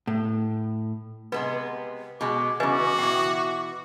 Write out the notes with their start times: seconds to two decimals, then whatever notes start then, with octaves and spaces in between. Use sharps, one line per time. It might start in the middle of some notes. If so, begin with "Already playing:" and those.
0.07 A2
1.32 C3 G#3 B3 B4
2.21 B2 G#3 D6
2.60 E2 C#3 F#4 B4 D#5 G#5
2.99 B2 E3 G5